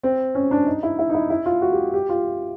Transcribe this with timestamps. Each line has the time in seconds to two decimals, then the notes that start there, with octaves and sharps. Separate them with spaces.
0.03 C4
0.35 C#4
0.51 D4
0.67 D#4
0.83 E4
0.99 E4
1.10 D#4
1.14 E4
1.30 E4
1.46 F4
1.62 F#4
1.72 G4
1.94 G4
2.09 F4